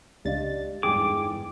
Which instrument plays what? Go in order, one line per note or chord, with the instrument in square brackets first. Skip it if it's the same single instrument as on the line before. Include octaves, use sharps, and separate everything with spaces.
[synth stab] C#2 A6 [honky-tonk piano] D4 [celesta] G4 D#5 F5
[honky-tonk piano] G1 E2 G#2 [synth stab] G#4 [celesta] G5 [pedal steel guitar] D6